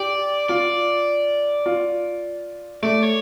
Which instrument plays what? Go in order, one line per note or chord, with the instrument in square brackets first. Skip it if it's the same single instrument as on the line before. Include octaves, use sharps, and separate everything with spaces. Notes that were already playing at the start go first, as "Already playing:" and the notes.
Already playing: [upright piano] G4 [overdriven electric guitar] D5
[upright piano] F4 [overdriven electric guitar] D5
[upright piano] F4
[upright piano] A3 [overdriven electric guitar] D5
[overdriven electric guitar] C#5